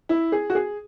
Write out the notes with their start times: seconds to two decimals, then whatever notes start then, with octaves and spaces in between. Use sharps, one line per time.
0.09 E4
0.32 G#4
0.50 F#4
0.55 G#4